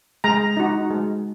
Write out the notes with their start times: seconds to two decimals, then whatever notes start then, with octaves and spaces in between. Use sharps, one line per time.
0.24 G#3 A#5
0.57 D#4 F#4
0.90 G#3